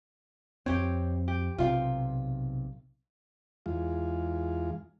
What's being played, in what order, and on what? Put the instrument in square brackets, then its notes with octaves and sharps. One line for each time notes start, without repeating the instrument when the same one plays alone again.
[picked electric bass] F2 C4 [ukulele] G4 C#5
[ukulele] G4
[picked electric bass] B1 C3 [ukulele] F4 F5 G5
[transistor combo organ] E2 G#3 F4